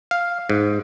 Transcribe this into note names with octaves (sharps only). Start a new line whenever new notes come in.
F5
G#2